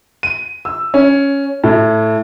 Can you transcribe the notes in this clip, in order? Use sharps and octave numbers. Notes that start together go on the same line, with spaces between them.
D#7
E6
C#4
A2